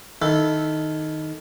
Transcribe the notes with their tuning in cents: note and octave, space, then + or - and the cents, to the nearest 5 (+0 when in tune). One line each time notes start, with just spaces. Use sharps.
D#3 +0 E4 -5 A4 +0